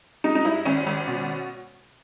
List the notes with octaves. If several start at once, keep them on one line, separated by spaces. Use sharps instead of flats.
G#3 D#4
D#4
G2 E4
G#1 C#4
G#1
B2